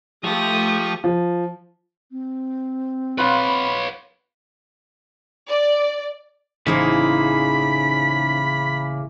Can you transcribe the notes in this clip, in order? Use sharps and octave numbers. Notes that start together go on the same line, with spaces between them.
F3 A3 F4 G4 C#6 D#6
F3
C4
F4 B4 C#5 F#5 B5
D5
A1 C#3 A#3 D#4 G#4 C5 B5